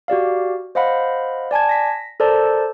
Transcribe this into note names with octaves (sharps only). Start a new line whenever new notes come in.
F#4 G4 D5 F5
C5 D#5 F5 F#5 B5
D5 G#5 A5 G#6
A#6 B6
A4 A#4 C5 D5 A5